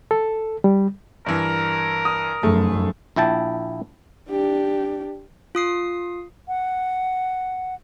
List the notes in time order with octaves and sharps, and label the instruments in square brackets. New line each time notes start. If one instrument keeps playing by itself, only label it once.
[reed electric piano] A4
G3
[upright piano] G2 E3 [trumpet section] A#4
[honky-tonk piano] D#6
[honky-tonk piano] F1 A3 G#4 [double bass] F#2
[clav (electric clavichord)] A#1 E4 G5 A5
[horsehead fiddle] D4 G4
[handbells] F4 D#6 C7
[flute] F#5